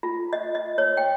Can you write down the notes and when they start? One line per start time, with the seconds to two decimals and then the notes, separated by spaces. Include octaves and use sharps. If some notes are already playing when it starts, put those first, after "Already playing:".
0.03 F4
0.33 D#5
0.55 D#5
0.78 C#5
0.97 G5